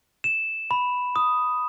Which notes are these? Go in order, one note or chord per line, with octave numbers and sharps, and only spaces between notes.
E7
B5
D#6